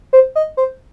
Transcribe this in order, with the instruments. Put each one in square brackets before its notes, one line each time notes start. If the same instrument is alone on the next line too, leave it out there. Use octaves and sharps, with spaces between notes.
[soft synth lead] C5
D#5
C5